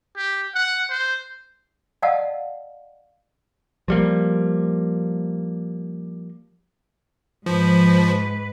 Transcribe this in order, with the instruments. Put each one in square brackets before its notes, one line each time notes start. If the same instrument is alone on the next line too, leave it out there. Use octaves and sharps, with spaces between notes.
[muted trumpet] G4
F#5
C5
[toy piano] D5 D#5 F5 F#5 A5 E6
[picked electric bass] F3 G3 A#3
[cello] G#2 B4 [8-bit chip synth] F3